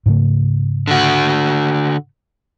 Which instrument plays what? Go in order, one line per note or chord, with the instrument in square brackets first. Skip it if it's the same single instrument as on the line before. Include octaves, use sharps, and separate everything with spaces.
[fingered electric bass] G#2 C#3 A3
[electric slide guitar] D3 F#4